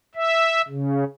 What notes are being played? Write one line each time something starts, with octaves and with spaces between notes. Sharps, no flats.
E5
C#3